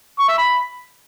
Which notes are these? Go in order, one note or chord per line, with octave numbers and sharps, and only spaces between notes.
C#6
E5
B5